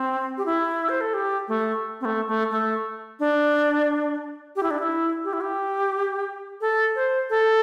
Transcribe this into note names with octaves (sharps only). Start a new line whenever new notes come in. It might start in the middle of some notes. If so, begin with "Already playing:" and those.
Already playing: C4
G4
E4
C5
A4
G4
A3
C4
A3
A3
A3
D4
G4
E4
D4
E4
G4
E4
G4
A4
C5
A4